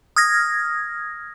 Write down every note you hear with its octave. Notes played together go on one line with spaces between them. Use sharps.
D#6 F6 G#6 A#6